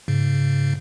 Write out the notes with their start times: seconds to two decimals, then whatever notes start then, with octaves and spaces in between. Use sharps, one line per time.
0.08 G#2 C#3